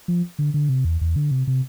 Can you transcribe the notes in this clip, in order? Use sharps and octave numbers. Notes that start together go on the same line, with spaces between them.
F3
D3
D3
C3
E2
E2
D3
C3
C3